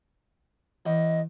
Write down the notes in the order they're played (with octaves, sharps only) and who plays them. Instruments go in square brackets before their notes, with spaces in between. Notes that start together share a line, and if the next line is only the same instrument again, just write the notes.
[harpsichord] E2 [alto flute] D#5